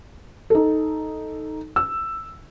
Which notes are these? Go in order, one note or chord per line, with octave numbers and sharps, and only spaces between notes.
D#4 A4
E6